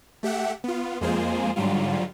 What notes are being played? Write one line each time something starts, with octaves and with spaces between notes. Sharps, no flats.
A3 G4 E5 F#5
B3 F4
F2 G#3 A#3 F4 G#4 C5
G#2 D3 F#3 G3 F4